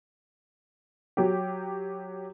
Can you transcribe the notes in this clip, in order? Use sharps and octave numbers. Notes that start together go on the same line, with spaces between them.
F#3 G4